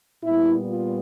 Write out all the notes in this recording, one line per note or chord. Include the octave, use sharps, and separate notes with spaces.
A#2 G3 B3 E4
F4